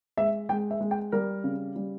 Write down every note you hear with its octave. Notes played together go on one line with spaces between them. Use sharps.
G#3 E5
G#3 G5
E5
G#3
G5
G3 A#4
C#3
G3